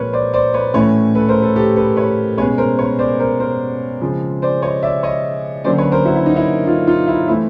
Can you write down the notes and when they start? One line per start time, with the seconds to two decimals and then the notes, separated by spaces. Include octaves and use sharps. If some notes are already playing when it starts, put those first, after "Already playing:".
Already playing: A#2 F3 G#3 C4 A#4 B4 C#5
0.13 C5 D5
0.34 C5 D5
0.54 B4 C#5
0.74 A2 E3 A3 C#4 B4 C#5
1.15 A4 B4
1.29 A#4 C5
1.42 A4 B4
1.56 G4 A4
1.76 A4 B4
1.97 B4 C#5
2.38 B2 G#3 C#4 B4 C#5
2.58 A#4 C5
2.79 B4 C#5
2.99 C5 D5
3.20 A#4 C5
3.40 A#4 C5
4.01 C#3 F3 G#3 C4
4.42 C5 D5
4.62 C#5 D#5
4.83 D5 E5
5.03 C#5 D#5
5.64 D3 F#3 A#3 C#4 C5 D5
5.78 B4 C#5
5.92 A#4 C5
6.05 E4 F#4
6.16 E4
6.26 D#4
6.36 E4
6.67 D#4 F4
6.87 D#4 F4
7.08 E4
7.28 E3 A3 C4 E4